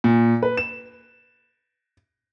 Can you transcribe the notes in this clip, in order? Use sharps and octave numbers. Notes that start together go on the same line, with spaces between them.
A#2
B4
E7